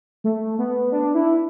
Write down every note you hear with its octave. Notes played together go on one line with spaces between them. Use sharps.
A3
B3
D4
E4